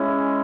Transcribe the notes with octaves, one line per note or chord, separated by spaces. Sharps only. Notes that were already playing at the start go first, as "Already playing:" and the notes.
Already playing: G#3 C#4 E4